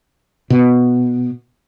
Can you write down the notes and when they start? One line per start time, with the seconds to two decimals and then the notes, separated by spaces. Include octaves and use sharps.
0.50 B2